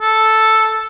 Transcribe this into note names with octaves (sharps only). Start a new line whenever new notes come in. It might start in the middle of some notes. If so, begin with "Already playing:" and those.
A4